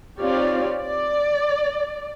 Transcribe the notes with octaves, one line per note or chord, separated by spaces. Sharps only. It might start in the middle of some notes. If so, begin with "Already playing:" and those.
C4 D#4 F4 G4 C#5 D5
D5